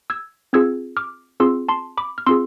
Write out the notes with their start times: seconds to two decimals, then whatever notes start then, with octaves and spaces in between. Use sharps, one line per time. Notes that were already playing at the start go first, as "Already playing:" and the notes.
0.10 E6 G#6
0.53 C4 F4 G#4 E6 G#6
0.97 D6 F6
1.40 C4 F4 G#4 C6 E6
1.69 A5 C6
1.97 B5 D6
2.18 F6
2.27 C4 F4 G#4 C6 E6